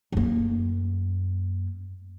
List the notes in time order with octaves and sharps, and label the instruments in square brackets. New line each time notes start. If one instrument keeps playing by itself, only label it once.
[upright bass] F#2 A#3